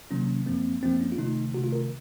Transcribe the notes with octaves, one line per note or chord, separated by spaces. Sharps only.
C3 D#3 F#3 A#3 C#4
F#2 F3 A#3 C4
F#2 F3 A#3 C4
C#4
F4
C3 D#3 A3 D#4
C3 D#3 A3 F#4
F4
A#4